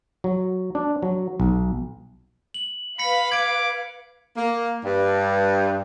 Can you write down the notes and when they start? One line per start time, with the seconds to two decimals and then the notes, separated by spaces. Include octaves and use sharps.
0.24 F#3
0.75 D4
1.03 F#3
1.40 B1
2.54 F#7
2.99 B4 F5 B5 B6 C#7
3.32 D6 G#6 D7
4.36 A#3
4.84 G2